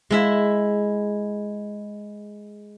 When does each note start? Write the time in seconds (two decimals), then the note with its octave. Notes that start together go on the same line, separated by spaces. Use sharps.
0.11 G#3 E4 E5